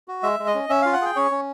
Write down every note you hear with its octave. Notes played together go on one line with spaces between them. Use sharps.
F#4
G#3 E5
G#3
D#5
C#4
C#4 E5
F4 F5
F#5
G#4 G5
C#4 C#5
C#4